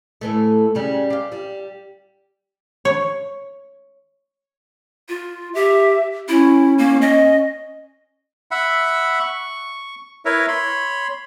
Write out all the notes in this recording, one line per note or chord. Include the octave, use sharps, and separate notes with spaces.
A2 E3 A3
C#3 G3
G4 F5
G3
C#5
F4
G4 E5
C#4 E4
A#3
D#5
E5 F#5 B5
C#6
E4 A#4 B4 C#5 E5
C#5 B5 C6